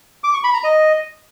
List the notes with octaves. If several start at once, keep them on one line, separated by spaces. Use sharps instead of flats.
D6
C#6
B5
A#5
D#5